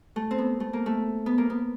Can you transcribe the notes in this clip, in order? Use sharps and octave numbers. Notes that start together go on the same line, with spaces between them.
A3
C4
B3
A3
A#3
A3
B3
A#3
B3